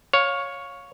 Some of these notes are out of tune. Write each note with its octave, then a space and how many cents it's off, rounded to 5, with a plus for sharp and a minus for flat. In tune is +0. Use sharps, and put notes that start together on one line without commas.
C#5 +0 F5 +20